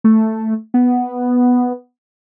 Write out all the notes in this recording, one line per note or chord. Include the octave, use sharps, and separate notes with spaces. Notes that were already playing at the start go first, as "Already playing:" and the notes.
A3
B3